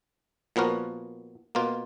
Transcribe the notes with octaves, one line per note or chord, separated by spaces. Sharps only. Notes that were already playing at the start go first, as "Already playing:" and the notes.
A#2 F3 B3 F#4 A#4
B2 A#3 F4